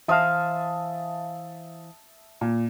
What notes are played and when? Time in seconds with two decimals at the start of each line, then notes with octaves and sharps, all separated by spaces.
0.08 E3 C5 E5 F5 A5 D#6
2.41 A#2